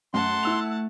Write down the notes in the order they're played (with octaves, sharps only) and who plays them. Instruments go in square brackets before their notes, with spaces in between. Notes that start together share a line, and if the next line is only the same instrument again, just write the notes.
[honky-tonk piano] F#2 [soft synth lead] A3 [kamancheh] F#5 A5 [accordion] C6
[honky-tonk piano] E4 E6 F7